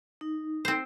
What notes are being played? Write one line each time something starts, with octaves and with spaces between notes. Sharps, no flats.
D#4
C4 C5